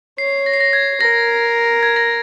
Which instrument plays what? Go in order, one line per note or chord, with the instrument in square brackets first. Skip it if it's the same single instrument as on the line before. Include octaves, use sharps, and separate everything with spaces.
[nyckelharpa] C#5 [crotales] C7
[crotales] A#6
C7
A#6
G#6
[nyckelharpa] A#4 [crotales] A#6
[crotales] G#6
A#6